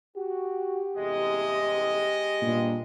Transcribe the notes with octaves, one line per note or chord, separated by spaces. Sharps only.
F#4 G4
A1 E2 C3 G#3 D#5
G2 A#2